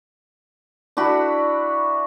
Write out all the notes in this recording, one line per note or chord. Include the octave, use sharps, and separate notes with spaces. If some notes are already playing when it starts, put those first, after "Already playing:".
D4 E4 F#4 B5